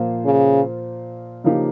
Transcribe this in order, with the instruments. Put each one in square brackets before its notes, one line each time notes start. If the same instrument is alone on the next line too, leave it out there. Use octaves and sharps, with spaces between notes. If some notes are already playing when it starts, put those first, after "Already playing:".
Already playing: [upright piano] A#2 F3 A#3 F4 C5
[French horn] C#3
[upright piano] C#3 F3 A#3 D#4 G4